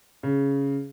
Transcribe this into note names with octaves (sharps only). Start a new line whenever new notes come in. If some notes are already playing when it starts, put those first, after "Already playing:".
C#3